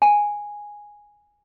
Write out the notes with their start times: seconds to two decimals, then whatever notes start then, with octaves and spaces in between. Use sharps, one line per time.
0.02 G#5